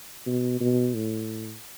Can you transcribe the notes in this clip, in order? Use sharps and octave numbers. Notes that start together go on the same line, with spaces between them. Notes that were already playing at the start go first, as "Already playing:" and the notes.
B2
B2
A2